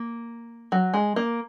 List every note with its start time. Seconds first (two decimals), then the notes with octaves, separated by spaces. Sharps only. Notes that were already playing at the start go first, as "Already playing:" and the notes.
Already playing: A#3
0.72 F#3
0.94 G#3
1.16 A#3